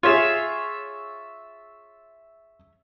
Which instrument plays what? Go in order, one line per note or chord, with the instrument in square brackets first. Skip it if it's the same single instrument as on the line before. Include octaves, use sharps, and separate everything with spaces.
[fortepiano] F4 G#4 [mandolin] C#5 E5